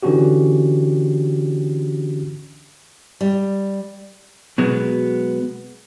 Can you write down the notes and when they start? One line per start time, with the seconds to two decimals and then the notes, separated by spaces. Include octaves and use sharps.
0.03 D3 E3 C#4 D4 F#4 G4
3.21 G3
4.58 B2 F#3 G#3 B3